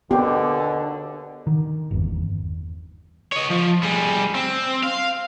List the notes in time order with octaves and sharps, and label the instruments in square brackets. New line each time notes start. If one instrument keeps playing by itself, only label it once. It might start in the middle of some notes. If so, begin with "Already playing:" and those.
[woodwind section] D#2 B2 [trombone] D3 [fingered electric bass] B3 [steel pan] G4
[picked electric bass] D#3
G1 E2
[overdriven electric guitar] C#5 D#5
F3
G3 G#4
C4
F5